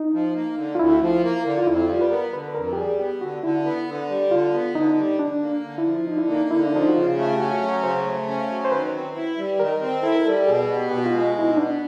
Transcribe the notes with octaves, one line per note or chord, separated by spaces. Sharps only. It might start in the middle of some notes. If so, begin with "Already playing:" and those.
Already playing: D#4
F3
A#3
D3
F4
D2 E4
F3
A#3
D3
F4
F2 E4
G3 F4
B4
B3 A#4
D3 B4
F2 A#4
G4
G3 G#4
B3 G4
D3 F#4
D3 E4
B3
D3
G3
D3 F4
B3
D3 D#4
G3
D3 D4
A#3
D3
E4
F3
D3 D#4
E4
A#3 D#4
D3 E4
D#4
D4
F3 D#4
F#4
C#3 F4
A3
G4
C#4 F#4
F#3
C#3 C5
A3
C#4
F#3
C5
D#3 B4
C4
E4
G3
D#3 A#4
C4
E4 A4
A#4
G3 A4
B2 G#4
B3
G4
B2 G4
F#4
F4
G#3
B2 E4
D#4
B3 D4